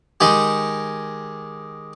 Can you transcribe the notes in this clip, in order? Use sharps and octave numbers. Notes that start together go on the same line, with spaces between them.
D#3 G#3 G4